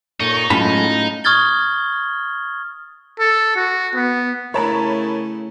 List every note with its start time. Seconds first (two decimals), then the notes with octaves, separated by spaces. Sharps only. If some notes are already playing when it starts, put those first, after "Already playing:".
0.20 A#2 D#4 A4 C#5 C#6
0.50 A2 F#3 G#3 C#4 F4 A4 A5 B5
1.24 C#6 D#6 F6 G#6 A6 G7
3.19 A4
3.56 F#4
3.94 B3
4.54 C#3 A3 E4 A#4 C#5 A5 B5